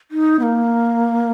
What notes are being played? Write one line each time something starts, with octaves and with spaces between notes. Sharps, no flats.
D#4
B3
A#3